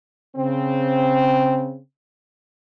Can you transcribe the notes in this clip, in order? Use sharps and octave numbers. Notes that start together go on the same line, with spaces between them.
C#3 C4